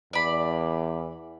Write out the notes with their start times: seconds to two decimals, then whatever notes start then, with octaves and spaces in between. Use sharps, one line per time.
0.13 E2 D5 B5